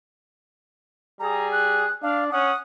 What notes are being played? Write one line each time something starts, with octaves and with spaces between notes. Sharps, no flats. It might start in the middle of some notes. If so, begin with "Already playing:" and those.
G3 G#4 A#5
F#6
D4 F5
C#4 F#5 D#6